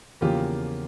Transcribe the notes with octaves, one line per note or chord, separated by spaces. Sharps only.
E2 C#3 F3 A#3 F4 G4